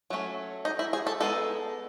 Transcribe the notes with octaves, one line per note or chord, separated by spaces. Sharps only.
F#3 A3 C#4
D#4
E4
G#4
A4
G#3 B3 D#4 A4